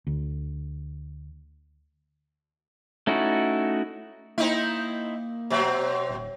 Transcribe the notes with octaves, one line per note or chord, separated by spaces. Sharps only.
D2
A3 C#4 D#4 E4 F#4
A#3 C4 D#4 E4
B2 F#3 C4
D#1